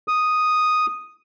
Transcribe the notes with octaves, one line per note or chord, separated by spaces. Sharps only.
D#6